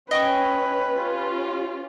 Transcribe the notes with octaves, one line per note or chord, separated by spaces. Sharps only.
C#4 B4 D#5 G5 C#6
C#4 F4 G4